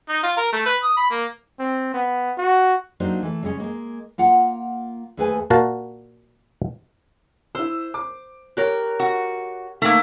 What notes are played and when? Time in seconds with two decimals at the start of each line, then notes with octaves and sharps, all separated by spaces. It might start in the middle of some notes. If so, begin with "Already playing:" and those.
0.09 D#4
0.23 F4
0.37 A#4
0.53 A3
0.66 B4
0.83 D#6
0.97 B5
1.10 A#3
1.59 C4
1.94 B3
2.38 F#4
3.00 F#3 A#3 D4 D#4 G4 C5
3.22 E3 A3
3.43 C#3 G3 G#3 C#4
3.60 G#3 A#3
4.18 A#3 F4 F#5
5.17 D#2 A3 G#4 B4 C5 G#5
5.50 A#2 F#4 A#4 F5 F#5 A5
7.55 E4 C5 E6
7.94 D6
8.57 G4 A#4 C#5 F#6
9.00 F#4
9.82 D#3 A3 A#3 A#5